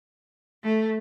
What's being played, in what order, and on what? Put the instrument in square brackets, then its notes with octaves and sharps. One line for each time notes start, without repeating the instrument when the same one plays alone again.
[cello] A3